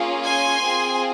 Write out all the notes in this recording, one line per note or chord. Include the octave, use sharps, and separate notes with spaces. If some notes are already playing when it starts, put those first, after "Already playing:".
Already playing: A#3 C#4 F4 G#4
G#5 C6
C4 F4 G#4